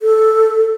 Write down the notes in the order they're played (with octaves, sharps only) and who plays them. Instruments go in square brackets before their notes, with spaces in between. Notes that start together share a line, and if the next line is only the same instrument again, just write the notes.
[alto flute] A4